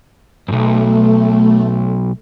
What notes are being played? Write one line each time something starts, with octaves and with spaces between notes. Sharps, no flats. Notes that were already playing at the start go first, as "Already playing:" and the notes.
B1 F#2 A3